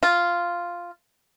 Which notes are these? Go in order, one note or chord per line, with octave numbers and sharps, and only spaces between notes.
F4